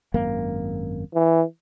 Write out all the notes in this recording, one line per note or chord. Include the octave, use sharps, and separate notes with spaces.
G#1 F#2 A#3
E3